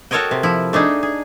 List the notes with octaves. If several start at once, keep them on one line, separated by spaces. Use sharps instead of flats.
F#4 A4 A#4 C#5 D#5 G5
C3
F3 E4
A3 D4 D#4 G#4
G#4